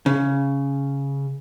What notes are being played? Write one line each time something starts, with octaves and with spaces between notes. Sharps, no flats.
C#3